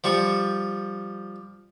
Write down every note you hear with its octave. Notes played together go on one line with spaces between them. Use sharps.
F3 G3 C#6